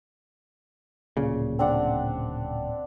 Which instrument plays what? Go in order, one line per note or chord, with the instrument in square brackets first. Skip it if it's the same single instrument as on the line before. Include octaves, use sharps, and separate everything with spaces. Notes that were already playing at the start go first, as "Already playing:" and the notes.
[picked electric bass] D1 A#2 C#3
[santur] C4 D4 F#5